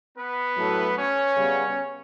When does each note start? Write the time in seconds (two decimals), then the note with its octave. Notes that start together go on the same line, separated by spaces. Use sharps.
0.17 B3 B4
0.57 A2 F#3 A3
0.96 C#4 C#5
1.36 C#3 G3 B3